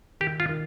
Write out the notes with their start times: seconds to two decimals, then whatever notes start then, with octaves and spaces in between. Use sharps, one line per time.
0.21 D#3 G4
0.40 F4
0.49 D#3